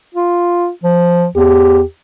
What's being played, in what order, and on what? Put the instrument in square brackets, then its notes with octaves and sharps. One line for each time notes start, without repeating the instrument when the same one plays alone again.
[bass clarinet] F4
F3
[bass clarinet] E2 [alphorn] G4